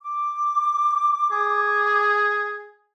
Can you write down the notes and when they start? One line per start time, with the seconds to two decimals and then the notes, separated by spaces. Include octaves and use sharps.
0.01 D6
1.31 G#4